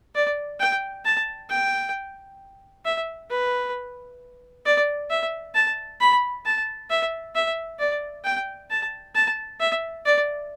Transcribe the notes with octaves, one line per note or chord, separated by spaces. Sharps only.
D5
G5
A5
G5
E5
B4
D5
E5
A5
B5
A5
E5
E5
D5
G5
A5
A5
E5
D5